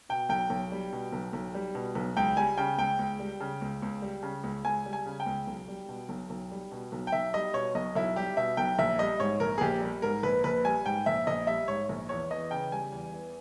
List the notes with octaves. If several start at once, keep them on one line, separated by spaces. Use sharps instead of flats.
B2 G5
B1 G5
B1
G3
B2
B1
B1
G3
B2
B1
C#2 G5
G3 G#5
C#3 G5
C#2 G5
C#2
G3
C#3
C#2
C#2
G3
C#3
C#2
C#2 G#5
G3
G#5
C#3
G5
C#2
B1
G3
B2
B1
B1
G3
B2
B1
G5
B1 E5
G3 D#5
B2 C#5
B1 D#5
B1 E4
G3 G4
B2 E5
B1 G5
A#1 E5
G3 D#5
G#2 C#5
A#1 A#4
G#4
A#1 G4
G3
G#2 A#4
A#1 B4
A#1 B4
G3 G#5
G#2 G5
A#1 E5
A#1 D#5
G3 E5
G#2 C#5
A#1
E2 C#5
E3 D#5
C#3 G5
G3 G#5
E2
E3